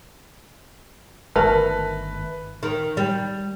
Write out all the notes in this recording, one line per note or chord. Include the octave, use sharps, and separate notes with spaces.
G1 D#3 A3 A#4 B4
D#3
G3